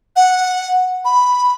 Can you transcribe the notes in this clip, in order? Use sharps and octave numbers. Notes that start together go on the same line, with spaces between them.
F#5
B5